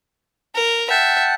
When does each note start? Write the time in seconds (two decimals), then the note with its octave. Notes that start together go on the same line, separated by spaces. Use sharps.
0.55 A#4
0.90 E5 F#5 G5 A5